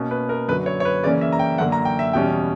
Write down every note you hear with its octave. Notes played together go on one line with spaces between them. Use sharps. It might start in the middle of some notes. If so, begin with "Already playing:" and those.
Already playing: B2 A#3 C#4
B4
A#4
F#2 D3 F#3 B4
C#5
C#5
B4
C#3 E3 A#3 C#4 D5
E5
A#5
G5
F#2 D3 A#3 F#5
A#5
G5
E5
E2 B2 G3 C#4 G5